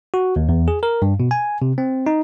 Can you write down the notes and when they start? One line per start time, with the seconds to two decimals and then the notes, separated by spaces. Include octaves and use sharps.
0.14 F#4
0.36 D#2
0.49 E2
0.68 G#4
0.83 A#4
1.02 G2
1.20 B2
1.31 G#5
1.62 C3
1.78 C4
2.07 D#4